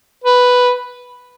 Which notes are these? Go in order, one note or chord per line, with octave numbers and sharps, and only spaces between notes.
B4